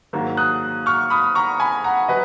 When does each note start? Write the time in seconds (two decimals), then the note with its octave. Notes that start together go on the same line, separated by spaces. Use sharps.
0.13 G#2 D#3 F#3 A#3
0.37 D#6 F#6
0.86 C#6 F6
1.10 B5 D#6
1.35 A#5 C#6
1.60 G#5 B5
1.84 F#5 A#5
2.08 F#3 B4 D#5